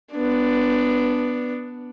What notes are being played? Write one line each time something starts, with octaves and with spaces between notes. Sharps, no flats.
B3 D4